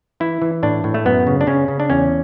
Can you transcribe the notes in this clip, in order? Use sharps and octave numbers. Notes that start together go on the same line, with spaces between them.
E3 E4
E3
A2 D4
A2
A3
F#2 B3
C#3
D4
C#3 C#4
C#3
D4
E2 C#4